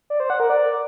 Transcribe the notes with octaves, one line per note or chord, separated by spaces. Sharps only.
D5
C5
F#5
A#4
D5